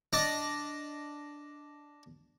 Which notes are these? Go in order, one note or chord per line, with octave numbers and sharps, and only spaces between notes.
D4 D#5